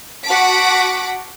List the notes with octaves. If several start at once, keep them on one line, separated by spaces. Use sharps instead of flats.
F#4 F#5 A5 D6 B6 D7